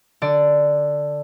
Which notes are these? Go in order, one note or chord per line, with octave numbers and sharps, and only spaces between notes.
D3 D5